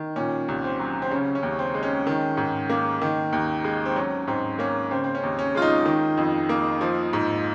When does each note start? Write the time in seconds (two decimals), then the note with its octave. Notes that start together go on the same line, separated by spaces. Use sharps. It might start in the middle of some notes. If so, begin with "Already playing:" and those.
Already playing: D#3
0.16 A#2 C#4
0.48 C2
0.64 C4
0.80 F#3
1.02 C4
1.11 C#3 C#4
1.35 C#4
1.43 D#2
1.59 C4
1.74 G#3
1.83 C#4
2.07 D#3
2.37 G#2
2.70 A#3
3.02 D#3
3.33 D#2
3.64 G#3
3.85 C4
3.96 F#3 C#4
4.27 G#2 C4
4.59 A#3 C#4
4.91 C#3 C4
5.04 C4
5.15 C#4
5.23 D#2
5.39 C#4
5.55 G#3 F4
5.62 D#4
5.86 D#3
6.17 F2
6.49 A#3
6.81 F3
7.13 G#2